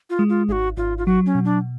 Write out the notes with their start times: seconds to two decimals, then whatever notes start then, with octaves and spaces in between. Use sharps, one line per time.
0.10 F4
0.19 G#3
0.29 F4
0.48 G#1 F#4 G#4
0.77 G#1 F4
0.98 F4
1.06 F#3 F#4
1.26 C#4
1.35 B2
1.45 D4